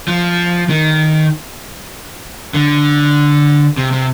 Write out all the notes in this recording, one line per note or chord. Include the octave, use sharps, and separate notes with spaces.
F3
D#3
D3
C3
C3